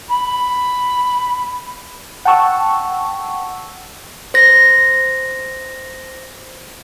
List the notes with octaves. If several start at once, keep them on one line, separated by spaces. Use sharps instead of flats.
B5
F#5 G5 A5 C#6 E6
C5 A#6